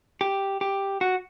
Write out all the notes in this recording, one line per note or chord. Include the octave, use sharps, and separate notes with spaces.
G4
G4
F#4